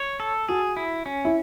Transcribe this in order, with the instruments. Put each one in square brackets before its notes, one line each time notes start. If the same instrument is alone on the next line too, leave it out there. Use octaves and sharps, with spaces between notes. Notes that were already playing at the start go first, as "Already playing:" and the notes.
Already playing: [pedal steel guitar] C#5
A4
[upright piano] F#4 [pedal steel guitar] G#4
[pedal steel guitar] E4
C#4
[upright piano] E4